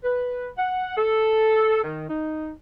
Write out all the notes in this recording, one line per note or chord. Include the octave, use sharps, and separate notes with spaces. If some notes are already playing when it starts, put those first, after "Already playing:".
B4
F#5
A4
D#3
D#4